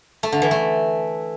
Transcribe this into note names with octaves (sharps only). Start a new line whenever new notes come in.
A3
D3
E3
A3